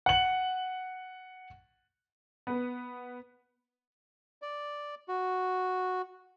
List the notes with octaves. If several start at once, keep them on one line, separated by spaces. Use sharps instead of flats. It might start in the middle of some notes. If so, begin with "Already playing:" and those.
F#5 F#7
B3 B4
D5
F#4